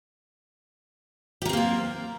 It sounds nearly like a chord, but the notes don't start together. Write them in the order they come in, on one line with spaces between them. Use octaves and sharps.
G4 A#4 C4 A#3 F4